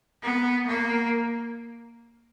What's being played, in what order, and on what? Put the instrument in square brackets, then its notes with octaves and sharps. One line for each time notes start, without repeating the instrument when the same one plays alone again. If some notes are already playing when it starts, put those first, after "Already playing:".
[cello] B3
A#3